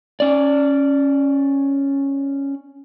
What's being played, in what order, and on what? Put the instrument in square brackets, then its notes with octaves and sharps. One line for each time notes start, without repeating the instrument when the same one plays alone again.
[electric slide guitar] C#4 D5